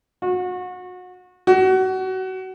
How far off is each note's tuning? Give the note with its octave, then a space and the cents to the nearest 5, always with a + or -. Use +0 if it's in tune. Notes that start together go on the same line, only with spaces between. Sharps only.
F#4 -30
F#4 +25